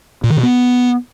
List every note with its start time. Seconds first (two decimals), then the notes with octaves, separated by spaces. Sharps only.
0.24 A#2
0.30 D#3
0.37 B2
0.43 B3